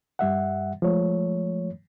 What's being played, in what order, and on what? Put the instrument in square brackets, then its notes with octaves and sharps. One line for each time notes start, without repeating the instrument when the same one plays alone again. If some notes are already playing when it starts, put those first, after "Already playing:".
[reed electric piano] G2 G3 E5 F#5
F3 G#3 A3 C#5